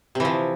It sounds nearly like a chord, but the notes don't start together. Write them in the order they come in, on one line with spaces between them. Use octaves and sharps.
C3 E3 F3